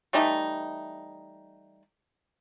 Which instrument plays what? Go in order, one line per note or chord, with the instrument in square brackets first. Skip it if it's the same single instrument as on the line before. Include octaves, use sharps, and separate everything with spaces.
[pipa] E3 G3 A3 D#4